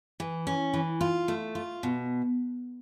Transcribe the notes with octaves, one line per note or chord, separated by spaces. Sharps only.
E3
C#4
E3
F4
A3
F4
B2